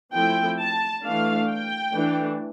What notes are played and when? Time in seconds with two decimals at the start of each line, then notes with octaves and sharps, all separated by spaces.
0.13 F3 A3 C4 E4 G5
0.59 A5
1.03 E3 A3 D4 F5
1.49 G5
1.94 E3 A3 D4